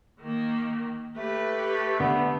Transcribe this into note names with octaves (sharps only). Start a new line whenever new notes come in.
D#3 A#3
A3 G4 B4
D3 A3 B3